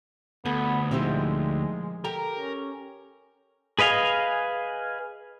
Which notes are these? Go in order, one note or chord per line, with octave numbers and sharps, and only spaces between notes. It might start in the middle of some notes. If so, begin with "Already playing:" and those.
D2 B3 A4
A#2 F3 G#3 C4 D#4 E4 G4
G4 A4 A#4 G5 A#5
C#4
G#4 B4 D#5 F5 G#5